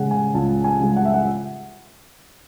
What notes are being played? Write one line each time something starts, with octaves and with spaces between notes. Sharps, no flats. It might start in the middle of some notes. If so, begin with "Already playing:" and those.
Already playing: C#3 G#3 F#5 G#5
G#5
C#2 A5
G#5
C#3 G#3
F#5
E5
F#5